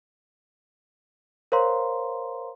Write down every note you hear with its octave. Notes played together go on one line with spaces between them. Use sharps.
A#4 C5 C#5 F5 A#5 C6